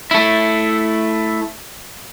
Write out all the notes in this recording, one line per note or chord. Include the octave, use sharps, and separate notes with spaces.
A3 E4